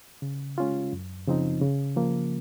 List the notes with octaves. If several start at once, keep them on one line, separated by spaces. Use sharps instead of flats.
C#3
G#3 C#4 F4
F#2
C#3 F3 C4 D#4
C#3
F3 A#3